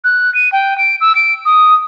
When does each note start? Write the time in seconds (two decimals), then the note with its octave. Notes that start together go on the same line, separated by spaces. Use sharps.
0.04 F#6
0.34 D#7
0.52 G5
0.78 D7
1.01 E6
1.15 D7
1.45 D#6